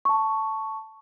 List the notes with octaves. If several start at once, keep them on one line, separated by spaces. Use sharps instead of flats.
A5 C#6